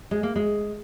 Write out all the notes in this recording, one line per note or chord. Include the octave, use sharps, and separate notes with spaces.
G#3
A#3
G#3